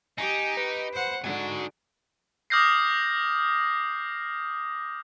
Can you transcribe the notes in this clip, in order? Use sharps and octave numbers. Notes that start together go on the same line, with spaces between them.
D#4 G4 G#5
B4
C5 F#5
D3 D#4 F#4 G#5
D6 D#6 F6 G6 A#6 C7